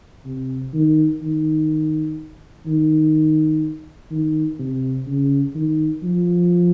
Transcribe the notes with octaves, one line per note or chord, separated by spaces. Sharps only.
C3
D#3
D#3
D#3
D#3
C3
C#3
D#3
F3